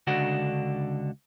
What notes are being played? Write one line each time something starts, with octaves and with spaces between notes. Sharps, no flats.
C#2 D3 D4 F#4 F#5